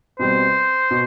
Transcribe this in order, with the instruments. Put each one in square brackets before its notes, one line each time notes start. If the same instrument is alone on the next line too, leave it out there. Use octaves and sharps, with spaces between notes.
[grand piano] B2 G3 C4 [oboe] C5
[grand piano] B2